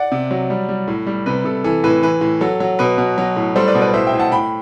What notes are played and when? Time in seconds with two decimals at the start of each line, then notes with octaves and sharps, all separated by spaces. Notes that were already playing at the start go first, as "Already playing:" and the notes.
Already playing: D5 F#5
0.12 C3
0.31 F#3
0.50 G3
0.69 G3
0.88 A2
1.07 G3
1.26 C3 B4
1.45 C3 A4
1.64 E3 A4
1.84 A2 B4
2.03 E3 B4
2.21 A2
2.41 F#3 A4
2.60 F#3
2.79 B2 B4
2.98 B2
3.18 F#3
3.36 A2
3.56 G3 A4 C5
3.68 B4 D5
3.75 B2
3.81 B4 D5
3.94 A2 C5 E5
4.07 E5 G5
4.13 A2
4.19 F#5 A5
4.32 A2 G5 B5